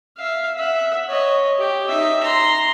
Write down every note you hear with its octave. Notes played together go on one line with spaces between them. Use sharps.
E5 F5
E5 F#5
C#5 D#5
G4
D#4 E5
A#5 C6